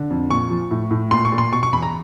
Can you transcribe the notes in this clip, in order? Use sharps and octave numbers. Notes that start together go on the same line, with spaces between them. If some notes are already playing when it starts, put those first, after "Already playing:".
Already playing: D3
F2
A#2 C#6
F3
A2
A2
A#2 C6
C#6
A#2
C6
B2 C#6
C#6
E2 B5
A#5